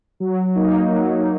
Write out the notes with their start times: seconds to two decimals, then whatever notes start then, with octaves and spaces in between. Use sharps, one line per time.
0.20 F#3
0.56 A#3 D#4
0.91 F#3